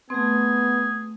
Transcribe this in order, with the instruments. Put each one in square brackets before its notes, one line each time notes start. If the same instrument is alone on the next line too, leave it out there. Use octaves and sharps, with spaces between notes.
[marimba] A3 C4 [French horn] B3 [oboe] G#4